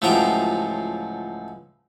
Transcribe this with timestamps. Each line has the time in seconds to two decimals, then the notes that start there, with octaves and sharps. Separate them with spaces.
0.02 C#2 A2 F3 F#3 G5 A#5